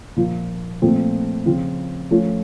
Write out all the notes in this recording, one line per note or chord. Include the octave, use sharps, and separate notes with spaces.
A#2 F3 A#3 F4
A#2 F3 A3 C4
C#3 F3 C4 F4
F3 A3 C#4 F4